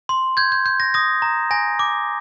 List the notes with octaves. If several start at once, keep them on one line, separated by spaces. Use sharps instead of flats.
C6
G6 G#6
G6
G6
A#6
D#6 A#6
A#5
G#5 A#6
D6